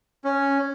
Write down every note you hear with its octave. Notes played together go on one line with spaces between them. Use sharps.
C#4